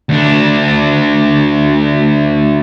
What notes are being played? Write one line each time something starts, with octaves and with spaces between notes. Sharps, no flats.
D2 D4